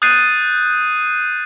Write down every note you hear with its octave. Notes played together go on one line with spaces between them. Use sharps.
D#6 F#6 G6 A6 C7 D#7